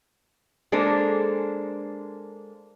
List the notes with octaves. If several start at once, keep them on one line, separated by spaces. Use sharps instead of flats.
G#3 A#3 D4 A4 C5